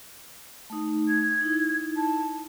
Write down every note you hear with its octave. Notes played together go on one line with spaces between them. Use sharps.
A3 D#4
G#6
D#4 E4
A5